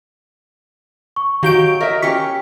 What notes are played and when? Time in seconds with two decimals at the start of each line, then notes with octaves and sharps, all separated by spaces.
1.16 C#6
1.43 D#3 F#3 F#4 G4 F5 G6 D7
1.81 A#4 D#5 E5
2.02 C#4 G4 A#4 C#6 B6